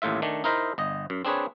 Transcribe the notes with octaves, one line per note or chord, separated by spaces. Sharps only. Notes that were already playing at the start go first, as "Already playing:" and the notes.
A1 D#2 A2 F4 E5
D#3 A3 D4
D#4 E4 A#4 C5 D#5 E5
G1 D#5
F#2
C4 D4 G#4 B4 C#5